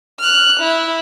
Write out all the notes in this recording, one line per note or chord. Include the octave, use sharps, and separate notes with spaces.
F6 F#6
E4